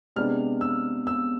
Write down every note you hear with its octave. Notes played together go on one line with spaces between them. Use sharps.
C3 G#3 B3 D4 F6
E6
E6